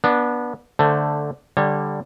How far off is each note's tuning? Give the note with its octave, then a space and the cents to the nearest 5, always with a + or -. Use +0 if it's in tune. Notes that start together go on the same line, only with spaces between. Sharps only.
B3 -25 D4 +0
D3 +0 A3 +10 C5 +0
D3 +0 G3 +5 C#5 -30